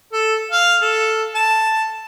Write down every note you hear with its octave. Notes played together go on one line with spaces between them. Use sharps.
A4
F5
A4
A5